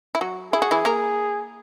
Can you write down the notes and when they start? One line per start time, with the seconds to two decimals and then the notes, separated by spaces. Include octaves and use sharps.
0.15 E4
0.21 F#3 F#4
0.53 E4 G#4
0.62 F#4
0.71 E3 E4
0.85 A#3 A#4